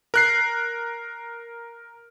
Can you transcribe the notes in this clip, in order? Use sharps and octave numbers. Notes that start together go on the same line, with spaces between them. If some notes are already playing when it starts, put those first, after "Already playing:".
A#4 F#6 C7